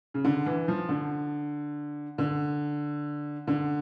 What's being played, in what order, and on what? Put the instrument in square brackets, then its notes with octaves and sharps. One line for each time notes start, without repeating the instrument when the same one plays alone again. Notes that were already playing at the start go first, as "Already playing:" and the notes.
[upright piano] C#3
D3
E3
F3
D3
D3
D3